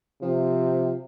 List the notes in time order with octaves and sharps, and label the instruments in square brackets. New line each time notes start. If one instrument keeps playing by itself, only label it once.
[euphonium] C3 [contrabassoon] F3